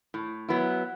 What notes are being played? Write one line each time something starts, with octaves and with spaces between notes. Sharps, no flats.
A2
F#3 B3 E4